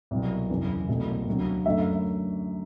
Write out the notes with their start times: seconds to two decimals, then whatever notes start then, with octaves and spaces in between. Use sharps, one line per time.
0.11 C2 B2 F#3
0.49 F#1 E2 C3 E3
0.88 C2 B2 F#3 A3
1.26 D2 C3 F#3
1.66 F#2 D3 F#3 A3 E5